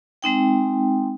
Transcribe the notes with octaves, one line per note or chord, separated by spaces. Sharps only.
G#3 C4 D#4 G5